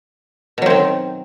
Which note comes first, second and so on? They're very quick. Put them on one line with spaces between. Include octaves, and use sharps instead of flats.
B2 F#3 C4 D#3